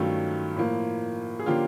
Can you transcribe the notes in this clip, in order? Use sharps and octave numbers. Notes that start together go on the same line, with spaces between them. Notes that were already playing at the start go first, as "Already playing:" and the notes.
Already playing: G2 D#3 F#3 A3 C#4 F4 G4
A2 F3 A#3
G#4
D3 F3 A#3 C#4 F4 G4